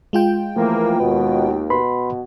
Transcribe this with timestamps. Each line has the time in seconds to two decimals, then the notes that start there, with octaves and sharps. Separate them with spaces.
0.13 G#3 F4 G5
0.56 E3 F3 A3 A#3
1.00 D#2 B2 B4
1.70 B2 B4 B5 C6